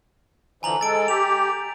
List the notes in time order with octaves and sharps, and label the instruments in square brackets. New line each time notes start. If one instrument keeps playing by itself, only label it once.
[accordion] D3 E3 F3 [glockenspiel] G#5 A#5 F#7
[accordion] G#3 A4 [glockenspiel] A6 D7
[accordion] G4 [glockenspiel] F7